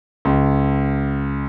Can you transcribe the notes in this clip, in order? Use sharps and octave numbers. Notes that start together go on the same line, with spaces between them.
C#2